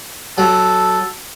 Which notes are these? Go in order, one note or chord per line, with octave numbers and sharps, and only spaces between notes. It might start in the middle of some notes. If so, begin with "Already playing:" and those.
F#3 A4